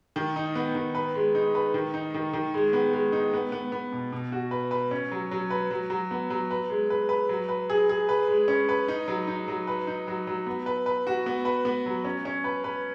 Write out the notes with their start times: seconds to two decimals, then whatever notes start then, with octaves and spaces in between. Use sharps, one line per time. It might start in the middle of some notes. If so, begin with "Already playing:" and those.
0.16 D#3
0.36 D#4
0.55 B3
0.75 D#3
0.95 B4
1.15 G#3
1.35 D#4
1.55 B4
1.74 D#3
1.94 D#4
2.14 D#3
2.33 D#3
2.54 G#3
2.73 B3
2.93 G#3
3.12 D#4
3.33 B3
3.52 B3
3.72 B3
3.92 B2
4.12 B2
4.32 F#4
4.51 B4
4.71 B4
4.91 C#4
5.11 F#3
5.31 F#3
5.50 B4
5.71 F#3
5.90 F#3
6.11 B3
6.30 F#3
6.51 B4
6.70 G#3
6.90 B4
7.09 B4
7.29 F#3
7.49 B4
7.70 G#4
7.89 G#4
8.09 B4
8.28 G#3
8.48 C#4
8.69 B4
8.88 D#4
9.08 F#3
9.27 D#4
9.48 F#3
9.67 B4
9.87 D#4
10.08 F#3
10.27 F#3
10.46 B3
10.66 B4
10.86 B4
11.07 F#4
11.26 B3
11.45 B4
11.65 B3
11.86 F#3
12.05 C#4
12.25 C#4
12.44 B4
12.64 B4